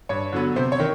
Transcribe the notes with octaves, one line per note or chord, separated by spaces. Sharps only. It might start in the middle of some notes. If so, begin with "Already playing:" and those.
G2 C#5
D3 F#3 B3
C3 C5
C#5
D#3